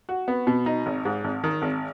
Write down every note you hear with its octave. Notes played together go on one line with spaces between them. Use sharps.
F#4
B3
B2
D#4
G#1
G#2
G#1
D#3
G#1